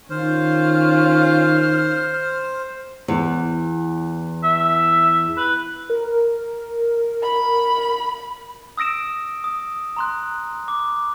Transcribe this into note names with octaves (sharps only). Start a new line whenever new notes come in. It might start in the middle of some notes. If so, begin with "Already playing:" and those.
D#3 C#4 F4 C5 F6
E2
E5
B4
A#4
B5
D#6 E6 A#6 D7 E7
D#6
A#5 C6 F#6
D6